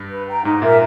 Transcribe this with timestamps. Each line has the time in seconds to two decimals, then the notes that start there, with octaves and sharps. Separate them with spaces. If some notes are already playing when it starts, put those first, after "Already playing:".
Already playing: G2
0.09 B4
0.27 G5 A#5
0.44 G#2 D#4
0.62 A#2 A#4 E5